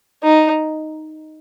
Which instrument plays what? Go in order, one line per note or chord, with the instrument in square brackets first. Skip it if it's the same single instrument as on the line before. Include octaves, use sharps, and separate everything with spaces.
[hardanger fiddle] D#4